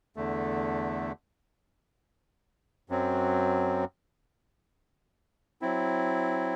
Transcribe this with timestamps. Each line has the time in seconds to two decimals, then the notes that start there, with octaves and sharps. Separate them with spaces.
0.16 E2 D3 A3
2.89 F#2 F#3 C4
5.62 F#3 C4 E4